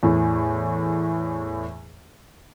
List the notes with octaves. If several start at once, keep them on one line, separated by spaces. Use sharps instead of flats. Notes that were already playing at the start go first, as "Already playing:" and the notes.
E2 A2